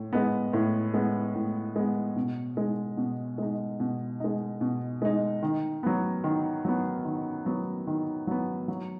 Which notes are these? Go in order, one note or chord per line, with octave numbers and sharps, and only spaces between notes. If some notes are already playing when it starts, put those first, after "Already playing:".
Already playing: A2
G#3 B3
A2
G#3 B3
A2
G#3 B3
B2
G#3 D#4
B2
G#3 D#4
B2
G#3 D#4
B2
G#3 D#4
D#3
F#3 B3
D#3
F#3 B3
D#3
F#3 B3
D#3
F#3 B3
F#3